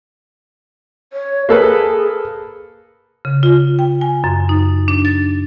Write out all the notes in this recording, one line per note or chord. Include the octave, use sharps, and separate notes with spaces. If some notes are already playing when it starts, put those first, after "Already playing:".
C#5
A#3 G#4 A4 B4
C#3
F4
G5
G#5
F#2
D#4
D4
A6